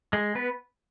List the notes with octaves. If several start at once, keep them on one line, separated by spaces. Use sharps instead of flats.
G#3 G#4
B3 B4